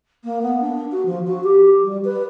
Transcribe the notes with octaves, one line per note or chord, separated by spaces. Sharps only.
A#3
B3
D4
F#4
F3
F#4
G4
G3
B4